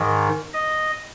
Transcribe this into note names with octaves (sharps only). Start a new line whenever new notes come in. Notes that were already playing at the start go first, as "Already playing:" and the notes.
Already playing: G#2 D#3
D#5